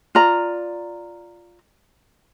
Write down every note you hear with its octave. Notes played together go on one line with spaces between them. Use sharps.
F4 D5 A#5